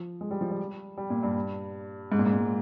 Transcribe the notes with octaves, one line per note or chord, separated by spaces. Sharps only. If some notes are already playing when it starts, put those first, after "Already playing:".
Already playing: F3
G#3
G3
F3
G3
G3
A#2
G2
G#2
A#2
G#2
A#2